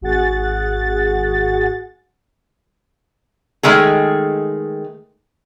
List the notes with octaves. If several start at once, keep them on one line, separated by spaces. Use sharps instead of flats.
G#1 F#4 G#4 F#5 A6
D#3 G#3 A3 G#4